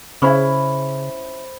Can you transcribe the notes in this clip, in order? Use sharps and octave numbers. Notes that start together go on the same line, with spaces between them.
C#3 C#4 E4 C5 B5